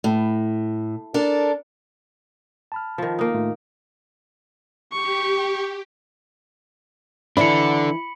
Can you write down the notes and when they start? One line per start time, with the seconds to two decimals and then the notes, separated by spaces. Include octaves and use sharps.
0.04 A2
1.14 D4 A4 A#4
2.72 A5 B5 F6
2.98 D#3 F3
3.19 A#3 D#4
3.34 A2 A3 F4
4.92 G4 C#6
7.37 E3 D4 A4 D5 E5 B5 C#7